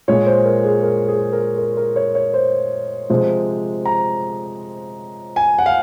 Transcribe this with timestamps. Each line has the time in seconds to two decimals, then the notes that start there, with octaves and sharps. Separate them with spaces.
0.08 A#2 G#3 C#5
0.26 C5
0.45 A#4
0.64 G#4
0.83 A#4
1.08 G#4
1.33 A#4
1.58 A#4
1.77 A#4
1.96 C#5
2.15 C#5
2.34 C5
3.10 C3 F3 G#3
3.86 A#5
5.36 G#5
5.59 F#5
5.66 F5